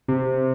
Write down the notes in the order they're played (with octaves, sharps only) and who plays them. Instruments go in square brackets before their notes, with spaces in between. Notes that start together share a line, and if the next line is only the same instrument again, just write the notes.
[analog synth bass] C3